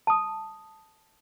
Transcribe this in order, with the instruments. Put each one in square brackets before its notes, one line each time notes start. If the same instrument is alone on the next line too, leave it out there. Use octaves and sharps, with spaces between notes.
[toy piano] A5 D#6